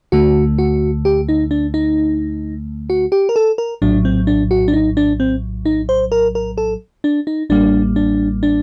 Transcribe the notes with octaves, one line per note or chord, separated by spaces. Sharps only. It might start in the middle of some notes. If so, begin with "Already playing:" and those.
D2 D3 A3 F#4
F#4
G4
D#4
D4
D#4
F#4
G4
A#4
A4
A#4
A#1 A2 F#3 D4
C4
D4
F#4
D4
D#4
D4
C4
D#4
C5
A#4
A#4
A4
D4
D#4
A1 A2 G3 A#3 D4
D4
D4